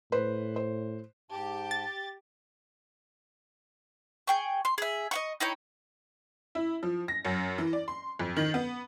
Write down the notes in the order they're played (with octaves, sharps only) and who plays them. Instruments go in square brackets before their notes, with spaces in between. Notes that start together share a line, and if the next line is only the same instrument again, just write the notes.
[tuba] A2 [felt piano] B4 C5
[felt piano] C5
[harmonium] G#2 A5 [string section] G4
[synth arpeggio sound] A6
[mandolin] G#4 G5 C#6
C6
G#4 E5
D#5 F#5 C#6
D#4 E4 C#5 G5
[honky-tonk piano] E4
F3
A#6
F#2
E3
D5
C6
F2
D#3
B3